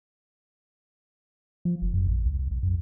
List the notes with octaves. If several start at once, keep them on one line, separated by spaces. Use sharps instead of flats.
F3
F#1
F#2
A#1
C#2
C2
C2
F#2